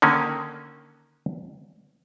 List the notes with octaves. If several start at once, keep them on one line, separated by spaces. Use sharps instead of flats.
D3 D#3 A#3 C#4